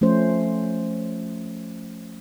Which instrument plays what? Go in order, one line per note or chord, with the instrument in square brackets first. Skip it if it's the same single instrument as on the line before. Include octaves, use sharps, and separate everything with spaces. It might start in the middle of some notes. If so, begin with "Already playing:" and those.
[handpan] F3 A3 C#4 C5